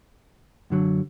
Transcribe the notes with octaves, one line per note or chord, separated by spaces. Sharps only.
F#2 D3 F#3